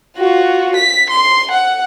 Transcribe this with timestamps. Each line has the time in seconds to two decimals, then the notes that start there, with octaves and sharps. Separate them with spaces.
0.18 F4 F#4
0.76 B6
1.10 C6
1.51 F#5